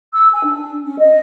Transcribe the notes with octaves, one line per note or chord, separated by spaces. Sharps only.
E6
G#5
D4
C#4
D#5